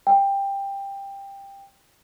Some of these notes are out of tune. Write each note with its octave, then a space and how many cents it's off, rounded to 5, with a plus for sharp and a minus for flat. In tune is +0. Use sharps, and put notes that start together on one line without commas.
G5 +15